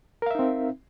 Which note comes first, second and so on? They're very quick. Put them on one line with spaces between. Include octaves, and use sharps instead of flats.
A#4 F5 E5 D#4 C4